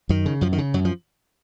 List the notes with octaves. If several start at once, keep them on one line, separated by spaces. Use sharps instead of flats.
F#2 D#3
C#3
F#2 F3
D#3
C#3
F#2 F#3
F3